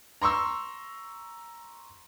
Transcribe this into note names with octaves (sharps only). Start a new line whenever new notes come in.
A#5 C6 C#6 E6